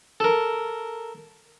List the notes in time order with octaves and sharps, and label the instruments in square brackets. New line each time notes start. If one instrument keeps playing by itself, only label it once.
[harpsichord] A4 A#4